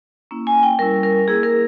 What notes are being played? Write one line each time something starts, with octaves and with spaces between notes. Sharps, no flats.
A#3 C#4 E4
G#5
G5
G3 C#4 E4 A#4
A#4
A#3 E4 G#4
A#4